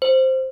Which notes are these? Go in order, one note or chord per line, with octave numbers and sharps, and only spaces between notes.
C5